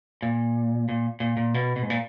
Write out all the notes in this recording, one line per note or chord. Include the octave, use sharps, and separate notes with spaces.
A#2
A#2
A#2
A#2
B2
B2
G#2
A#2